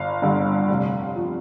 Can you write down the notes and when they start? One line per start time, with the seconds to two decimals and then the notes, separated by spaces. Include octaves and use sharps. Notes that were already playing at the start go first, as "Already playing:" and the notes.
Already playing: G1 F5
0.22 G2 D3
0.69 F1
1.16 F3